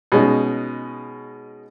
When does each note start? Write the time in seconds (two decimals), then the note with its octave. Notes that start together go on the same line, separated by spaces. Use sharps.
0.12 B2 G#3 C#4 D#4